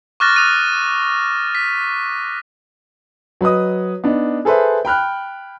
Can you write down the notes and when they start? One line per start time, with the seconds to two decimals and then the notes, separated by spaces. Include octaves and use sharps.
0.20 C#6 D6 F6 F#6 A6 A#6
0.36 D#6 F#6 D#7
1.55 B6
3.41 F#3 B4 D#5 D#6
4.04 B3 D4 D#4
4.45 G#4 A4 B4 C5 E5
4.85 G5 B5 F6 F#6